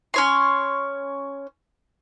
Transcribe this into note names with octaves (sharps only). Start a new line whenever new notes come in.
C#4 C#5 C6